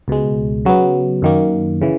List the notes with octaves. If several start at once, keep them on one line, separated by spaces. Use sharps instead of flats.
C#2 B2 G#3
C#3 F#3 B3
F#2 D#3 A#3
C#3 E3